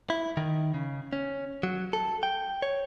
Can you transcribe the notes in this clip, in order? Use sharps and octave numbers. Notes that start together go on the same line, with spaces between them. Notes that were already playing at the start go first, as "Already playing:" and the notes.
E4
D#3
C#3
C#4
F#3
A4
G5
C#5